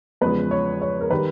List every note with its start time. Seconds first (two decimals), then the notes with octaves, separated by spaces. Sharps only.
0.21 E2 C#3 F3 G#3 B4
0.51 C#5
0.82 C#5
1.01 A#4
1.11 D#3 G3 B4